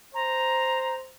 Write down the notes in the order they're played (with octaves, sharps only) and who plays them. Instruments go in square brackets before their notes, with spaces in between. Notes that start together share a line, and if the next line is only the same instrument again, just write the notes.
[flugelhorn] C5 [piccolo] A#5